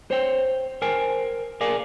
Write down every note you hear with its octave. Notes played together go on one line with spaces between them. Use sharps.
C5 C#5 G5
A#4 C5 G5 G#5
G#4 A#4 D5 F5 G#5